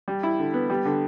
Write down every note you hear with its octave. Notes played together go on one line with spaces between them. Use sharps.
G3
E4
D3
B3
G3
D3